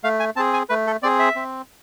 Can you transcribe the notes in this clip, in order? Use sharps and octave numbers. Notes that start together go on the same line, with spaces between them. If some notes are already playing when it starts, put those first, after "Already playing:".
A3 F5
G#5
C4 G#4 A5
G#5
A3 B4
A4
C4 G#4 D5
E5
C4